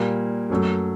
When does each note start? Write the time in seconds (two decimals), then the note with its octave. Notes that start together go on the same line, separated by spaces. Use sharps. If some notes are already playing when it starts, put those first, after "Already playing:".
Already playing: A#2 G3 A#3
0.50 F#2 F#3 A3